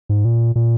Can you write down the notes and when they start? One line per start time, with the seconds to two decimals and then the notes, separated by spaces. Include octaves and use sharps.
0.09 G#2
0.25 A#2
0.56 A#2